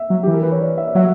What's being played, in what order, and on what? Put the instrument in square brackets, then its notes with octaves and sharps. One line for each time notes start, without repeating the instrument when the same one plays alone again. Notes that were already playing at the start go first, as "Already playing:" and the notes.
Already playing: [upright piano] E5
[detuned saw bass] F#3
[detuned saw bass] E3 [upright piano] G4
[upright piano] A#4
B4
C#5
D5
E5
D5
[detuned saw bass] F#3 [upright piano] E5